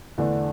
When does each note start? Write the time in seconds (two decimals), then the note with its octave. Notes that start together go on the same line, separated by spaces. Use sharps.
0.18 E2 D3 A3 D4